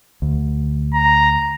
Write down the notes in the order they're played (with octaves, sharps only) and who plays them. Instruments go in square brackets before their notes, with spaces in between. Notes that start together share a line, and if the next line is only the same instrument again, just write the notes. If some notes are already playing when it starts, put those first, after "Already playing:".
[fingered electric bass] D2
[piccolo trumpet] A#5